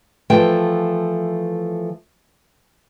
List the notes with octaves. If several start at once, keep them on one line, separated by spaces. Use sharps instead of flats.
E3 F3 A3 G5